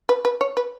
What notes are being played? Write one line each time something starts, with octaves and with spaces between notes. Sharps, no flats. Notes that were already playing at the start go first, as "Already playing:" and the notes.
B4
B4
C#5
B4